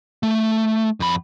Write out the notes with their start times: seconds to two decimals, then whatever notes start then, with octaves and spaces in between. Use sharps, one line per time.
0.23 A3
1.00 F2 B5